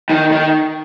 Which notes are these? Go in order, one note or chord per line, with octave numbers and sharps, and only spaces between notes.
D#3
D#3